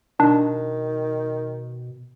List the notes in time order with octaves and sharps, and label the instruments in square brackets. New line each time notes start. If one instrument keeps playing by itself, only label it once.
[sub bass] B2 [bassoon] D#3 [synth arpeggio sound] D4